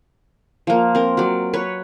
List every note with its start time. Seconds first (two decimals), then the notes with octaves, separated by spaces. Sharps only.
0.67 F3 A#3
0.95 C4 A#4
1.17 F#3 D5
1.53 B4 C#5